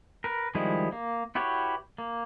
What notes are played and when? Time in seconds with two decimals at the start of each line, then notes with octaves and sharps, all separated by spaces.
0.24 A#4 B4
0.55 D#3 F3 G3 G#3 E4
0.92 A#3
1.35 E4 F#4 G4 B4 C#5
1.98 A#3